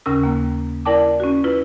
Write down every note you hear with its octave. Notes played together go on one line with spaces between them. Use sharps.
D#2 C#3 C#4 A#4 E6
D#2 A#3
E4 A#4 D5 G5 A5 D6
C#4 F#4
E4 F4 B4